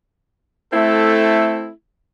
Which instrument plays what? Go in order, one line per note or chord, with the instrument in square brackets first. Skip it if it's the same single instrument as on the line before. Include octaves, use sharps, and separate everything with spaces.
[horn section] A3 C4 E4 A4